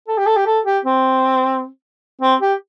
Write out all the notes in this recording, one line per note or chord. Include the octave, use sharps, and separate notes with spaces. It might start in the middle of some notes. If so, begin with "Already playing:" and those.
A4
G4
A4
G4
A4
G4
C4
C4
G4